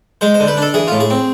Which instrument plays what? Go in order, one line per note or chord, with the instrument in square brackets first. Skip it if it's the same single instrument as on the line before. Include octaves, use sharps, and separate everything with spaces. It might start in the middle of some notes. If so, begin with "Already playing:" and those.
[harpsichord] G#3 C5
C5
D3
B4
D4 A4
E3 G#4
A2 F4
G#4
C4